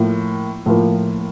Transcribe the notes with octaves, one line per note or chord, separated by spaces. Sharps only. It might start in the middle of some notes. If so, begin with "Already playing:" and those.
Already playing: A2 F3 A#3
A2 F3 A#3